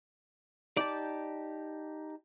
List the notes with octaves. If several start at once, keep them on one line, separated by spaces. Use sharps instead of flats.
D#4 G4 D5 A5